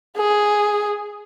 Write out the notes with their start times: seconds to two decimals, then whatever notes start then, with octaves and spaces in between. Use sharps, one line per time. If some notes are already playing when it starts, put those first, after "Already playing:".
0.17 G#4